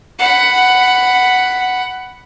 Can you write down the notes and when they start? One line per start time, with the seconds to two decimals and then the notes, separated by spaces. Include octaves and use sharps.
0.19 F#5 B5